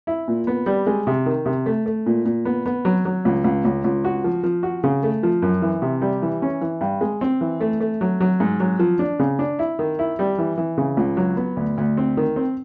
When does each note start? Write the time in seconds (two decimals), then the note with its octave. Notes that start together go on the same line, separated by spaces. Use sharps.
0.07 E4
0.28 A#2
0.47 B3
0.66 G3
0.87 G#3
1.07 C3
1.26 D#3
1.46 C3
1.66 A3
1.86 A3
2.06 A#2
2.25 A#2
2.45 B3
2.66 B3
2.85 F#3
3.05 F#3
3.25 C#2
3.44 C#2
3.65 C#2
3.84 C#2
4.04 F#4
4.24 F3
4.43 F3
4.63 F#4
4.84 C#3
5.03 A3
5.23 F3
5.42 F#2
5.62 E3
5.82 C3
6.02 G3
6.22 E3
6.42 C#4
6.61 E3
6.81 G2
7.01 G#3
7.21 C4
7.41 E3
7.61 A3
7.80 A3
8.01 F#3
8.21 F#3
8.40 G#2
8.60 F#3
8.79 F3
8.99 D4
9.19 C#3
9.39 D4
9.59 E4
9.79 D#3
9.99 E4
10.19 G3
10.38 E3
10.58 E3
10.78 C#3
10.97 C#2
11.17 F#3
11.37 B3
11.57 D2
11.78 D2
11.97 C4
12.17 D#3
12.36 C4